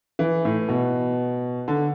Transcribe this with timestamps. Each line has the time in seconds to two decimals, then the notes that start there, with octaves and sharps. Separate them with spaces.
0.19 E3
0.45 A2
0.69 B2
1.68 D3